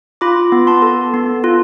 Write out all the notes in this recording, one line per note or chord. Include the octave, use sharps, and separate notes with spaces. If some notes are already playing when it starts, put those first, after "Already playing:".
F4 B5 D6
B3
A5 C6
A4
B3
F4